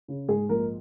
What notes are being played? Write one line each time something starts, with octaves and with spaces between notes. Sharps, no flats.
C#3
G#2 G#4
A#1 A#4